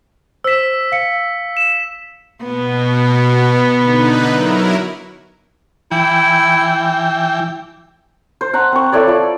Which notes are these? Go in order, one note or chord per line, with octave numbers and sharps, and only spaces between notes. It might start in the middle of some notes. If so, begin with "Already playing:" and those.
C5 E6 B6 E7
F5 C#7
E7
B2 B3
D3 D#4 B4
F#3 E4 A#4
E3 E4 G5
C5
F#5 A5 A#5
C4 C#6
E4 A4 C#5 D5
F3 D5